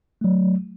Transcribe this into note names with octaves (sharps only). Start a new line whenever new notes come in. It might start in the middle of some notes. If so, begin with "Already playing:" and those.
F#3 A3